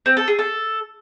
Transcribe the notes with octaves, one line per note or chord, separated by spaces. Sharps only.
C4
A4
G#4
A4